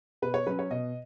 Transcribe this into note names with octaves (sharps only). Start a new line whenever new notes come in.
B2 B4
C#5
F#3 C#4 B4
C#5
B2 D#5